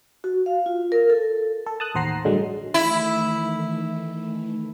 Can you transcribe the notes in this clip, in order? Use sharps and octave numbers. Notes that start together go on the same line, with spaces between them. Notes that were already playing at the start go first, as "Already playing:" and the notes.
F#4
F5
F4
A#4
A4
A4
A5 D#6 F#6
A1 D#2 C5 F#5 A#5 C7
A1 G2 D3 F#3 G#3
D#3 E3 A3 E4